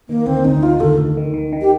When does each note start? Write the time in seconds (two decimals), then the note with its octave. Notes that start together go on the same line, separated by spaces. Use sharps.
0.09 D#3 A#3
0.26 D2 C4
0.45 D2 D#4
0.63 D#3 F4
0.80 D2 A4
0.99 D2
1.17 D#3
1.34 D#3
1.53 D#3
1.61 G4